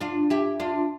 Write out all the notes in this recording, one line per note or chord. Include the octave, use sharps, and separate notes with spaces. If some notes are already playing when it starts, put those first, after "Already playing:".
D4 F4
E4 G4
D4 F4